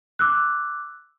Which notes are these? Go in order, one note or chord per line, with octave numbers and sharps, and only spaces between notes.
D6 E6 F#6